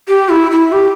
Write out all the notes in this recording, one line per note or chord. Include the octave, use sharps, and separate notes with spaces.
G4
E4
E4
G4